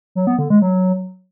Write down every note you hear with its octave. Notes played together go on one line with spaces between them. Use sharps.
F#3
B3
D3
G#3
F#3